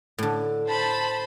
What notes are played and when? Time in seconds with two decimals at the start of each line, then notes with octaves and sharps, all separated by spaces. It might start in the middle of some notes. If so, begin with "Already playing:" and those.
0.18 A2 D3
0.68 C5 A5 B5